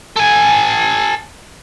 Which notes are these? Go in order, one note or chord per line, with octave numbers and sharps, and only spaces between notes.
A4 G#5